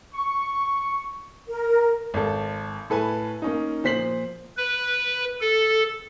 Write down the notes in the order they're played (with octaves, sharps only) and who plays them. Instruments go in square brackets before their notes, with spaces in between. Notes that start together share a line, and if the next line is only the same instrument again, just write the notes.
[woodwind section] C#6
[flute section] A#4
[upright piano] G#1 A4
A2 A4 B4 G#5
A#3 C#4 D#4
A#2 F3 C5 B6 C7 F#7
[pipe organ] B4
A4